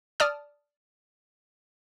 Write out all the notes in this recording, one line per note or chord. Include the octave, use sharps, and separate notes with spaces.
D5 A5 D#6 F6